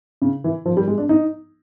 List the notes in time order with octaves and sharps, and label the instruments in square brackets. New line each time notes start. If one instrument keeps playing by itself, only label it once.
[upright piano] C#3
E3
F3
G3
G#3
D4
D#4